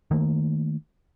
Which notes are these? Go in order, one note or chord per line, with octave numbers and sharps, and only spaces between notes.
D#3 A3 A#3